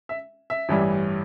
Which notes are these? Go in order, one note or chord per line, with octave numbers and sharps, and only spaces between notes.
E5
E5
A1 G2 E3 G3